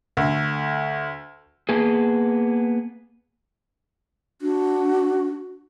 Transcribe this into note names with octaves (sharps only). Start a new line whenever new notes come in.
D2
A#3 B3 G#4
D4 F#4